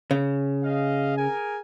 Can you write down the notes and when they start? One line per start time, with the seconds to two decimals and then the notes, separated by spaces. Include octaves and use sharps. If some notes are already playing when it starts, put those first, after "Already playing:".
0.11 C#3
0.64 G#4 D#5 F5
1.17 G#4 A#4 G#5